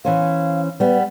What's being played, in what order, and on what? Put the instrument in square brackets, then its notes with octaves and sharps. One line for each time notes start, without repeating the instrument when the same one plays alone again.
[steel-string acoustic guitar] E3 C#4 C5 [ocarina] F5
[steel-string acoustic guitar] G3 B3 [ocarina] B4